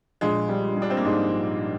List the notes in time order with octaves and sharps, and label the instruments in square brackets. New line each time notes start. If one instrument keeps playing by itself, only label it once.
[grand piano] A#1 [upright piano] G#3
[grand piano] G3
[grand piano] G3 [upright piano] D4
[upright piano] C4
A#3
[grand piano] G#2 [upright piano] G#3